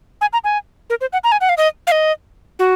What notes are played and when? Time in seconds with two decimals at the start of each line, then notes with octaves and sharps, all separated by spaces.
0.21 G#5
0.33 A#5
0.44 G#5
0.90 A#4
1.01 C5
1.13 F#5
1.24 A#5
1.32 G#5
1.41 F#5
1.49 F5
1.57 D#5
1.87 F5
1.92 D#5
2.59 F#4